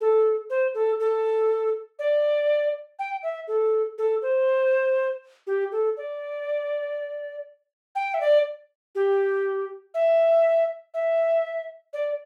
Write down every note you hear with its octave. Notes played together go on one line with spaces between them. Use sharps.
A4
C5
A4
A4
D5
G5
E5
A4
A4
C5
G4
A4
D5
G5
E5
D5
G4
E5
E5
D5